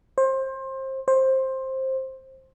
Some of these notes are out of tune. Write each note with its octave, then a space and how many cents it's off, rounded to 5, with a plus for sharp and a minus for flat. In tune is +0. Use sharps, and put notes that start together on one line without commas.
C5 +25
C5 +15